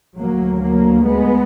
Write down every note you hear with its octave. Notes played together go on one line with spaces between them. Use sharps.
D2 F#3 A#3
F#3 A#3
G#3 B3